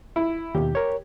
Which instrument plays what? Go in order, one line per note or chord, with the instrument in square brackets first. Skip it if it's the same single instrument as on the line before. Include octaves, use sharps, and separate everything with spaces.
[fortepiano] E4
[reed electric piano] D#2 B2 [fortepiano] G4
[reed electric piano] A#4 C#5